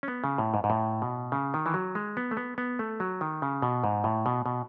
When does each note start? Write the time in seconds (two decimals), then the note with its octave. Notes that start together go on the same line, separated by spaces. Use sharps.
0.03 C#4
0.08 B3
0.24 C#3
0.38 A2
0.54 G#2
0.64 G#2
0.70 A2
1.02 B2
1.32 C#3
1.54 D#3
1.66 E3
1.74 F#3
1.95 G#3
2.17 B3
2.31 A3
2.37 B3
2.58 B3
2.79 A3
3.00 F#3
3.21 D#3
3.42 C#3
3.62 B2
3.84 G#2
4.04 A2
4.26 B2
4.46 B2